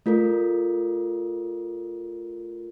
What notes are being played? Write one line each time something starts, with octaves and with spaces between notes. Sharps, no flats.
A3 F4 A4 A#4